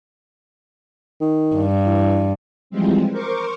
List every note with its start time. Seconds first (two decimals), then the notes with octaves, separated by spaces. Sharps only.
1.21 D#3
1.56 G2
1.86 E3
2.70 E3 F3 G3 G#3 C4
3.11 A#4 C5 C#6 D6